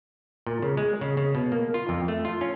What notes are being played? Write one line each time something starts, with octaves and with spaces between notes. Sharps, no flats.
A#2
C#3
G#3
C#3
C#3
B2
A#3
F4
F2
A3
F4
C#4